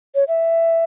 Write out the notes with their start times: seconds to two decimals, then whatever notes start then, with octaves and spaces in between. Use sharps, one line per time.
0.15 C#5
0.28 E5